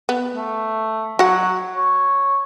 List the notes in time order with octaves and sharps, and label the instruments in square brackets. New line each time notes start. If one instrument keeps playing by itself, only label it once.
[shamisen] B3
[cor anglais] A3
[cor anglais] F#3 [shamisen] F#4 F#5
[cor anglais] C#5